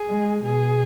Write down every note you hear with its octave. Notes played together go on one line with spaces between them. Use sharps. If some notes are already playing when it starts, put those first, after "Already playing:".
Already playing: G#4
G#3
B2 G#4